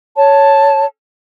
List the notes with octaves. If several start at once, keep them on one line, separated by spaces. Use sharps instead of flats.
C#5 A5